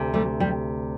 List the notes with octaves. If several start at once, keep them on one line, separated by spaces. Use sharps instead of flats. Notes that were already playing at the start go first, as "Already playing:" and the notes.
Already playing: D2 C3
G3 A3
G3